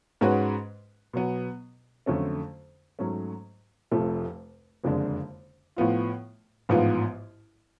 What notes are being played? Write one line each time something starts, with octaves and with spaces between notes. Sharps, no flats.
G#2 G#3 C#4 F#4 B4
B2 F#3 B3
F2 D3 F#3 A3 C#4
G#2 F#3 A3 C#4
F1 F2 F3 A3 F4
F#1 F2 D3 G#3 D4
A2 F3 B3 F4
A1 G#2 F3 B3 F4